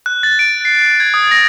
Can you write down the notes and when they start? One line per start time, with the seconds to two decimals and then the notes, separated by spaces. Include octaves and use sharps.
0.06 F#6
0.23 A6
0.39 D7
0.65 C7
1.00 G#6
1.14 D#6
1.31 A#6